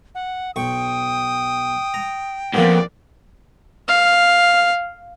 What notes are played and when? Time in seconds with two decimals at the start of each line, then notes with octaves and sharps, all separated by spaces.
0.15 F#5
0.56 B1 G5 C#6 D#6
1.94 A#5
2.54 F2 G#2 A#3 B3 D5
3.88 F5